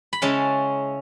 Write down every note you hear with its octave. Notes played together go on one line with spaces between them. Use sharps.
B5
C#3 G#3 C#4 E4 A5